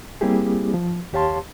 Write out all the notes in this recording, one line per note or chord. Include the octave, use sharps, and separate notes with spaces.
G3 A#3 C4 E4 G4 G#4
F3
D#2 G4 C#5 F5 A5 C6